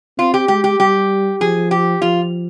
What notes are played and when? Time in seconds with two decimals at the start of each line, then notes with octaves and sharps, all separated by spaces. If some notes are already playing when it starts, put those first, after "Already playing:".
0.18 C4 F4
0.34 G4
0.48 G#3 G4
0.64 G4
0.79 G3 G4
1.41 F3 G#4
1.71 G4
2.01 F3 F4